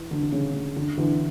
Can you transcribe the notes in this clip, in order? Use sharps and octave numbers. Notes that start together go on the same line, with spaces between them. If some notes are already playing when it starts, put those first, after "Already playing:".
Already playing: E3
D3
D3
C#3
C#3
D3
D3 E3